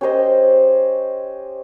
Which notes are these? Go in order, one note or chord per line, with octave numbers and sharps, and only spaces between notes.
C#4 G4 C5 D#5